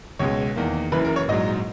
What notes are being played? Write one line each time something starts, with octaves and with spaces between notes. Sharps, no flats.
C#2 B2 G#3 C#5
E2 D#3 A#3
F#1 F#2 E3 B4
A#4
C#5
A#1 G#2 F#3 D#5